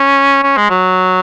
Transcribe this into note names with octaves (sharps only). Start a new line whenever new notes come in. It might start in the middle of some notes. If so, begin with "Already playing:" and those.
Already playing: C#4
C#4
G#3
F#3